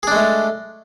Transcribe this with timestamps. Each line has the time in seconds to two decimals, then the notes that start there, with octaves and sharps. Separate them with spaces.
0.03 G#4
0.07 D4
0.12 G#3
0.16 A3